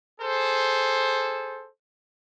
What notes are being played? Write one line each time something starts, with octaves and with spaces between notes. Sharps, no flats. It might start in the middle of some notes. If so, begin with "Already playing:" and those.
G#4 A4 C5